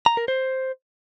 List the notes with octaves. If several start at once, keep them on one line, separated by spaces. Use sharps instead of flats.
A#5
A#4
C5